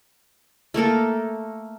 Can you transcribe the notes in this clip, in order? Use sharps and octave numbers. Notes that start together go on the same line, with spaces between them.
A3 A#3 A4 A#4